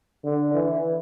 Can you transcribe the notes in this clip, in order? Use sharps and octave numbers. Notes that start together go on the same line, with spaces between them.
D3
E3